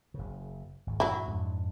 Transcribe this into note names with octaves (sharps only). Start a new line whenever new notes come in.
F#1 C#3
G#1
G2 A#2 E3 F#3 E4
F2 G#2 D4